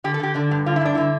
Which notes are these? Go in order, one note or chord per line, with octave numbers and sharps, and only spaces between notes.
D3 G4
A4
D3 G4
D3 D4
G2
D3 F4
E4
G2 D4
D3 E4